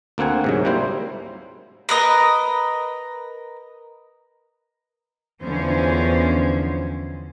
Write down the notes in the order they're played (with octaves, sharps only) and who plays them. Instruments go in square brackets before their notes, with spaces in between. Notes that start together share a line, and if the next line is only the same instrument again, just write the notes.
[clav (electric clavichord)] D2 A#3 C4 F#5 G#5
G#2 C3 F#3
G3 A#3 E4 C5
[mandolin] A#4 B4 D#5 A#5
[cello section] E2 D3 F3 C#4 C5